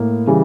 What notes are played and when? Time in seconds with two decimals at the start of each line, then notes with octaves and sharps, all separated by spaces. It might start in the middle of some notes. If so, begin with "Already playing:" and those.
Already playing: A2 A#3
0.27 C#3 E3 G3